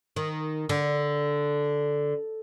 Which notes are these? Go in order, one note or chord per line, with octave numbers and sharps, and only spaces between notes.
D#3
D3